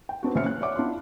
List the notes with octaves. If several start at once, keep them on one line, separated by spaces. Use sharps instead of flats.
G5
B3 C4 D4 F#4
A#1 C#3 C5 E5 F6 C#7
F#6
C#5 D5 E5 F#5 D6
D4 E4 F4 C6